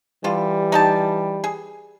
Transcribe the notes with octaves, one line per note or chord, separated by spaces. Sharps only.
D3 E3 G3 F4
D#4 G4 A5
G#4